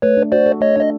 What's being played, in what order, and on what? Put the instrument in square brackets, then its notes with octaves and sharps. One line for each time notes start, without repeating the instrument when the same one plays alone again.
[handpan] A3 [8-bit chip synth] B4 C#5
[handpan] D4
[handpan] F#4 [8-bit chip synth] C5 D5
[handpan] A4
[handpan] A3 [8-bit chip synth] C#5 D#5
[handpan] D4 [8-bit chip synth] D#5